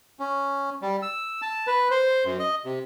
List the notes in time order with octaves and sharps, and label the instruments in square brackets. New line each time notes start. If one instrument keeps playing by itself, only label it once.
[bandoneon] C#4
G3
E6
A5
B4
C5
F#2
D#5
C3